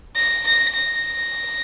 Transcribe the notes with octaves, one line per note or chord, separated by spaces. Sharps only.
A#6
A#6
A#6